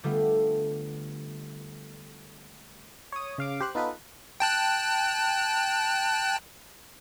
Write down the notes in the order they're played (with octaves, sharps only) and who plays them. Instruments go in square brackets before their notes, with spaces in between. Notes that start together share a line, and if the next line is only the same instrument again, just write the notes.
[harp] D3 G3 A3 B3 F4
[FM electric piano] C#5 D#6
C#3 F5 D6
G4 C5 F#6
B3 D#4 F4 A4 B4
[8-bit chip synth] G5 A5 F#6